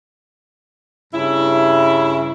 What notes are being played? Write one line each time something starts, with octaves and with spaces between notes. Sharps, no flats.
G2 C#3 E4